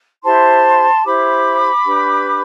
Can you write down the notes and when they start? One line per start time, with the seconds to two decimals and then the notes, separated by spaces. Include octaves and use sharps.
0.23 E4 G4 C5 A5 C6
1.04 E4 G4 C5 B5 D6
1.86 D4 G4 B4